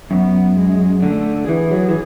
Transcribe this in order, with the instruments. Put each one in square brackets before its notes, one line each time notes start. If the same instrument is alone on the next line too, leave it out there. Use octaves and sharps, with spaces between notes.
[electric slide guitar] F#2 [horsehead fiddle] B3
[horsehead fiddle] G#3
[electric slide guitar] D3 [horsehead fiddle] A3
[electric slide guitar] E3 [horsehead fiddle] G#4
[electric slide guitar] F#3
E3